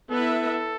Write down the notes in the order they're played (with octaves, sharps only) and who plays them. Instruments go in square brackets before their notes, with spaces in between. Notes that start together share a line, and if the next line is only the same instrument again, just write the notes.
[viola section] B3 E4 B4 E5 [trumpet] A4